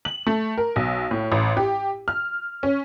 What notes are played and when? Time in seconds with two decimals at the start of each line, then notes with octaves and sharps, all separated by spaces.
0.05 F#7
0.27 A3
0.58 A#4
0.76 B1
1.11 A2
1.32 A1
1.57 G4
2.08 F6
2.63 C#4